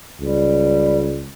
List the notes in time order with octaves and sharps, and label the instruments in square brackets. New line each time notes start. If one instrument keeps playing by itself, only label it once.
[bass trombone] C#2 [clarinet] G3